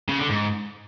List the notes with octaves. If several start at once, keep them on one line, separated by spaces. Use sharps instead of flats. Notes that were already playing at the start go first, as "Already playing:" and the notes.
C#3
D3
G#2